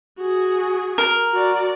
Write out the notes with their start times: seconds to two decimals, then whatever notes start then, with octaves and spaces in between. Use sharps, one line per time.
0.18 F#4 G#4
0.98 A#4
1.32 F#4 D5